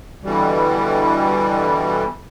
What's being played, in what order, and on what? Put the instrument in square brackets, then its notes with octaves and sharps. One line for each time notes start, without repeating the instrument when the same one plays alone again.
[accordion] B2 D3 E3 G3